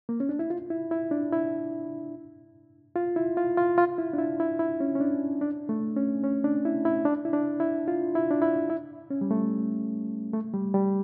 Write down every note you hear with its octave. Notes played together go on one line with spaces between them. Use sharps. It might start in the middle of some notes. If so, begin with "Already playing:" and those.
A#3
C#4
D4
E4
F4
E4
E4
D4
E4
F4
E4
F4
F4
F4
E4
D4
E4
E4
E4
C#4
C#4
D4
D4
A3
C#4
C#4
D4
E4
E4
D4
E4
D4
E4
F4
E4
D4
E4
E4
C#4
G3
A3
A3
G3
G3